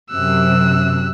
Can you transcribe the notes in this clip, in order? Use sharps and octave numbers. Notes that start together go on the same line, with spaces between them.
F#2 C3 E6 F#6